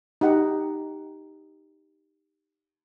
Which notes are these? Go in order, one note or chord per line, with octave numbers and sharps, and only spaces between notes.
D#4 G4 F#5